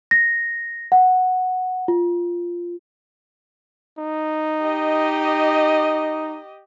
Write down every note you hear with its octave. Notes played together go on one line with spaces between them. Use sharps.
A#6
F#5
F4
D#4
G4 D#5